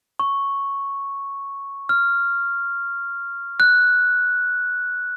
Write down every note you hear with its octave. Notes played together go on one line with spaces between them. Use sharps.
C#6
F6
F#6